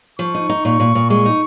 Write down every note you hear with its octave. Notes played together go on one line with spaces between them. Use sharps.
F3 C#6
D#4
D#4
A#2 C#6
A#2
A#2
G#3 C#6
D#4